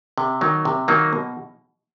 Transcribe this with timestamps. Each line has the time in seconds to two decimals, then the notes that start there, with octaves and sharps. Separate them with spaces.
0.18 C3
0.41 D#3 F#3 A#3 D#4
0.65 C3
0.88 D#3 F#3 A#3 D#4
1.13 B2